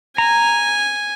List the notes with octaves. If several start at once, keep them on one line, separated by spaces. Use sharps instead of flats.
G#5 A#5